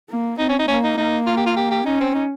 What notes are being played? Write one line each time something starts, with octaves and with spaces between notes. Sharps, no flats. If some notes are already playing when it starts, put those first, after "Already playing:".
A#3
C4 D#4
C#4
D#4
A#3 C#4
D#4
A#3 D#4
F4
G4
F4
G4
G4
C#4 D#4
C4
D#4